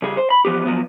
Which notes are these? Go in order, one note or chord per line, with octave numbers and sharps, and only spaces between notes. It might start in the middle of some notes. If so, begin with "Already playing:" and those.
C#3 G3 G#4
C5
B5
E3 F3 B3 G4
F3 F#3 B3